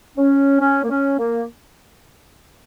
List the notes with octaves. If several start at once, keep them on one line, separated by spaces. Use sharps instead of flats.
C#4
C#4
A#3
C#4
A#3